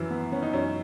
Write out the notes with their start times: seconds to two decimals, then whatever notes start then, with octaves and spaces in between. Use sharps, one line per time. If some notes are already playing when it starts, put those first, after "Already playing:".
Already playing: F#2 E3
0.10 B3
0.32 B3 C#4
0.42 D#4
0.53 F#2 C#4